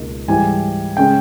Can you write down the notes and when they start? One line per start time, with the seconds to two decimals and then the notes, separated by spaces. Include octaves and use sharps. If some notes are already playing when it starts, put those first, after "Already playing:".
Already playing: C#2 B2 A#3 D#4
0.28 G#2 E3 G3 G#5
0.97 C#3 G#3 C#4 G5